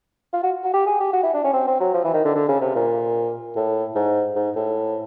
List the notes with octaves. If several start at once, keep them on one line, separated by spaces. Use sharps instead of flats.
F4
F#4
F#4
G4
G#4
G4
F#4
E4
D4
C#4
C4
C4
F#3
F3
E3
D#3
D3
D3
C#3
C3
A#2
A2
G#2
G#2
A2